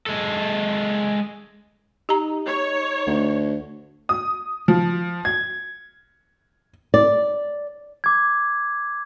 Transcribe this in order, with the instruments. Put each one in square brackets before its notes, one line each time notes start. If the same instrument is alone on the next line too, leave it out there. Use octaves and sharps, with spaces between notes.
[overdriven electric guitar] G#3 A4
[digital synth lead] D#4 [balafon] G4 A#5
[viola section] C#5
[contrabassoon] D2
[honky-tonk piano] D#6
F3
G#6
[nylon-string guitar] D5
[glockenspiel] D6 G#6